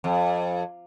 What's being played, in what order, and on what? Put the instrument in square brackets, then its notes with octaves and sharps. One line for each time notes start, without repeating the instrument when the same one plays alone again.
[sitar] F2